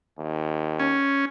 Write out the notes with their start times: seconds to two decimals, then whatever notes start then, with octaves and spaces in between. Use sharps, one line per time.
0.19 D#2
0.79 C#4